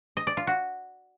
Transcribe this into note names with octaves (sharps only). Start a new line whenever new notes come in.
D#5
D5
F4
F#4